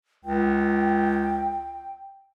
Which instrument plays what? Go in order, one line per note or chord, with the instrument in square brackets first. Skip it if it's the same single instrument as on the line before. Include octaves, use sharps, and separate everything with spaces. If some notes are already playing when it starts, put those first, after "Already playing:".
[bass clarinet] C#2 [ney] G5